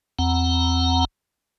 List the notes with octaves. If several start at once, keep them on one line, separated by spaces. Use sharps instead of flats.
E2 C4 F#5 A#5